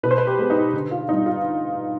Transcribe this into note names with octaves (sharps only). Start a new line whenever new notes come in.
B2 B4
C5
B4
G4
G#3 B3
D#4
D3
F4
G3 B3 D#4
F4